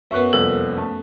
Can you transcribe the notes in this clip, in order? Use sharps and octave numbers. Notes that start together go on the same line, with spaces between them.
F#2 B3 E5 C#6 F#6
C2 F2 A#3 A4
A3